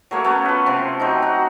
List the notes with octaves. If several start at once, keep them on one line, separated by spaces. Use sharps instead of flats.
F#3 A3 A#3 C#5
A3 B3 C#4
F4 B4
C3 F3
F#3 C4 D#4
F#4